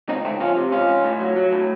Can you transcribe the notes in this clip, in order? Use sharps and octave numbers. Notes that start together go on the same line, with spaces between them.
C#2 C4 D#4
C#2 A3 C4
F3 C#4 F4
C3
C#2 C#4 F4
C#2
A2
F#3
F#3
A2